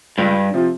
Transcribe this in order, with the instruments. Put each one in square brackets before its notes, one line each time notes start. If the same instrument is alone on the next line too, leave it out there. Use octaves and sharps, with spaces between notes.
[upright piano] C#2 [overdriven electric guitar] G2
[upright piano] C3 F3 C4 F4